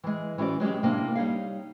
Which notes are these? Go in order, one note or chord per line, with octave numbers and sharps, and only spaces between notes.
E3 G#3
E3 C#4 F#4 C5 D5
F#3 G#3 C#4 G4
C3 A#3 D4 E4
G3 D#4 C#5 F5